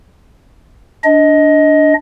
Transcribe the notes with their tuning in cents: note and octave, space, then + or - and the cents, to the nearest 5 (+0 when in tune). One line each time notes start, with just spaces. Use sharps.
D4 -5 D#5 +15